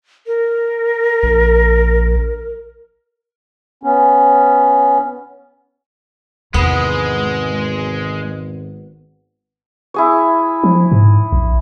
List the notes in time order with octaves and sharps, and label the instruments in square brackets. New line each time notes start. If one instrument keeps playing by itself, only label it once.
[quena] A#4
[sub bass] A#1
[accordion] B3 C#4
[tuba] G#1 [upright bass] E2 C3 [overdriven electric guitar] G#3 [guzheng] B3
[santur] E4 G#4 C#5
[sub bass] F3
G#2
A#1